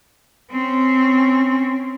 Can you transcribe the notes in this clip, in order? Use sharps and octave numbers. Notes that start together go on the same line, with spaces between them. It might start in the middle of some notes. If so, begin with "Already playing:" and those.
C4 C#4